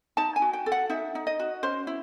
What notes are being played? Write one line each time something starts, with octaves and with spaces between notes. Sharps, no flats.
D#4 A5
G#5
F#4
G5
A4
F#5
D#4 E5
D#4
D#5
F#4
C#4 C5
E4